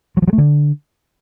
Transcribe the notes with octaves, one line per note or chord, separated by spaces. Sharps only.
F#3
F3
F#3
A3
D3